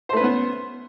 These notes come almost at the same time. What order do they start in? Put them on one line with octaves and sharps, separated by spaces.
C5 A3 B4 C#4 B3